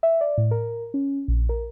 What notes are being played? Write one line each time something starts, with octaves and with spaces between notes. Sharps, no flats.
E5
D5
A2
A#4
C#4
A#1
A#4